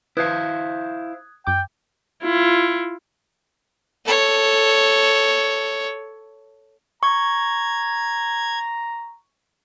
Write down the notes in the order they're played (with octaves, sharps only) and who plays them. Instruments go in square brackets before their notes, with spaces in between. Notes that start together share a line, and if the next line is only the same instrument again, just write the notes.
[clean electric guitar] E4 C5 F5 [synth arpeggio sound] B4 [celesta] D#6 F#6 G#6
[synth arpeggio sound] F#2 D6 [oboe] G5
[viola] E4 F4
[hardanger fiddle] A4 C#5
[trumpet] A#5 [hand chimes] C#6 [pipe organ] G#6